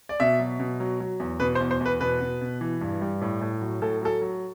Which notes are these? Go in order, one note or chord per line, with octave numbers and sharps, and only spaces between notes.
D5
B2 E5
F#3
B2
F#3
F#3
E2
B2 B4
C5
E2
C5
E2 B4
B2 B4
B2
B2
E3
G2
G3
A2
A2
F#3
A2 A4
F#3 A4
F#3